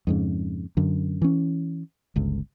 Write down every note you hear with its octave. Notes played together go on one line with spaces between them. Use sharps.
F2 G#2 C#3
F#2 D3
E3 C#4
G1 C#2